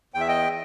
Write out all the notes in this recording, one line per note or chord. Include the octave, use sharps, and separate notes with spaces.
E2 G5
E5
D#5 G5